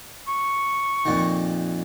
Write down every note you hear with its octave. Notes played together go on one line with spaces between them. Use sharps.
C#6
F2 A#2 D#3